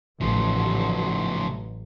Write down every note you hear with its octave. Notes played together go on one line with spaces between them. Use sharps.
A1 C#3 F3 F#3